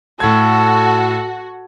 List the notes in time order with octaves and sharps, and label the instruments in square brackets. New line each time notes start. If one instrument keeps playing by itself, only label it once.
[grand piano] A2 G#6 [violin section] F#4 [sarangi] A4